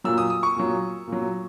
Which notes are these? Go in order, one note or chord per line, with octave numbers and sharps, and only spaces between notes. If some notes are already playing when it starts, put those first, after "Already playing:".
A#2 F#3 E6
D#6
D#6
C#6
A#2 F#3
A#2
F#3